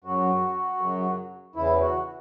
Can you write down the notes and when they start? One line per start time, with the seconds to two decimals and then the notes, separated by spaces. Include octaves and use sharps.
0.04 F#2 C#3 F#3 F#4
0.80 F#2 C#3 F#3
1.55 E2 C#3 E3 E4
1.81 F#4